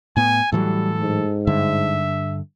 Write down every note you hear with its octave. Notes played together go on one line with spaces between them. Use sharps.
A2 B3 G#5
A2 E3 F#3 G3 A4
G#2
G2 D3 E5